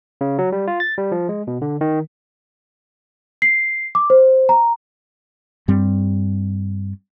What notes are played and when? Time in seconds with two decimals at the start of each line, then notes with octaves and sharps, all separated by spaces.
0.21 C#3
0.39 F#3
0.52 G3
0.67 F4
0.80 A6
0.98 G3
1.12 F3
1.29 G#3
1.47 B2
1.62 D3
1.81 D#3
3.42 C7
3.95 D6
4.10 C5
4.49 A#5
5.68 G2 G3 C4